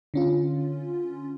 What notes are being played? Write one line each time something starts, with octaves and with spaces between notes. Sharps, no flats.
D3 C#4 F4